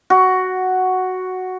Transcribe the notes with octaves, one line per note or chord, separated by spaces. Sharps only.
F#4